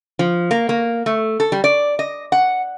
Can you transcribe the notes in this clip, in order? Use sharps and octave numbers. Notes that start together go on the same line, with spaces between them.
F3
A#3
A#3
A3
A4
G3
D5
D#5
F#5